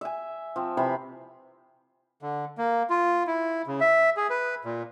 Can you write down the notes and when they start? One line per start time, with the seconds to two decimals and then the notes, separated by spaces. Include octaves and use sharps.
0.01 E5 G#5
0.56 F3 C4
0.77 C3 E3 B5 C6
2.22 D3
2.58 A#3
2.90 F4
3.27 E4
3.67 C#3
3.80 E5
4.17 G#4
4.30 B4
4.65 A#2